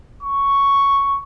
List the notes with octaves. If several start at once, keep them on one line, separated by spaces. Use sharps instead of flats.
C#6